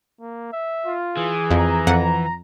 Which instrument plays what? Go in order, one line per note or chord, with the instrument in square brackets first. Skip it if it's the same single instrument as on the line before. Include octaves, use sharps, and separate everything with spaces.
[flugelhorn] A#3
E5
[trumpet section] F4
[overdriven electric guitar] E3 [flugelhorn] G#4
[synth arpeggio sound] F2 [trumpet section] A#5
[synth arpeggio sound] F2 F#5